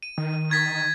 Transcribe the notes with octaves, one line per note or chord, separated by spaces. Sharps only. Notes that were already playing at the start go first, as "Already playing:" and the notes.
D#7
D#3
G#6 A6 B6